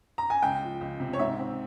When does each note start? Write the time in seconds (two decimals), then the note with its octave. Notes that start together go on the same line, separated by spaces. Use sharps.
0.18 A#5
0.30 G#5
0.43 C#2 G5
0.62 F3
0.81 C#2
1.00 C3
1.13 C#5
1.19 G#2 E5
1.39 C4